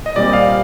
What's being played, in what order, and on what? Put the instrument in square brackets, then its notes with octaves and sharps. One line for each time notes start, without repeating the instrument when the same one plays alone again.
[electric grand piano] D#5
A#2 G3 C4 D5
F5